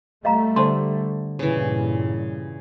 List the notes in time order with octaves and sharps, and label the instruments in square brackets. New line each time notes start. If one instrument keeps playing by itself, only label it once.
[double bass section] G3 A3 [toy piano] D#5 F5 A#5
[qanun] D3 [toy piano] C5 A5 C6
[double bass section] G2 A#2 [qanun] C#3 E3